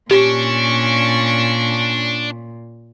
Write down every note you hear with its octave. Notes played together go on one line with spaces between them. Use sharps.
A#2 C#4 D4 G4 C#6